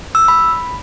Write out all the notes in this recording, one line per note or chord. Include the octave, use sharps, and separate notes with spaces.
E6
B5